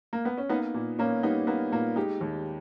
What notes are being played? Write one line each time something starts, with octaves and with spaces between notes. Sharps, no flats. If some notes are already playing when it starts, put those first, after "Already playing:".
A#3
B3
C#4
A#3 B3 D#4
A#2
A#2 A#3 C#4
G3 B3 D#4
A#3 B3
A#2 A#3
G#3 D#4 G4
D#2